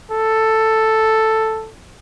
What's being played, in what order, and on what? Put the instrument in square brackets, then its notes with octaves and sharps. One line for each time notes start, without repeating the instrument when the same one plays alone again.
[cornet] A4